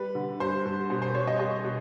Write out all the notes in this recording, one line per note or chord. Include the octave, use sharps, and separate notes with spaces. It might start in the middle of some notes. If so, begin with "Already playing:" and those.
Already playing: G3 B4
D3
G2 C5
G2
B2 C5
C5
G3 C#5
D#5
G3 D#5
B2